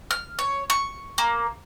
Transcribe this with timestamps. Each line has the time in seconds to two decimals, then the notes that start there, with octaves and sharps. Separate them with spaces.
0.11 F6
0.39 C#5
0.70 C#6
1.18 A#3